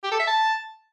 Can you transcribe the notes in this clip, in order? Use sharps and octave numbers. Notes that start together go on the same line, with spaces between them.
G4
A4
E5
A5